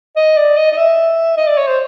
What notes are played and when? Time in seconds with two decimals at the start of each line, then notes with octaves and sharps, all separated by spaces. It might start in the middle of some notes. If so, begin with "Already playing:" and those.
0.16 D#5
0.37 D5
0.57 D#5
0.72 D#5
0.77 E5
1.37 D#5
1.47 D5
1.57 C#5
1.67 C5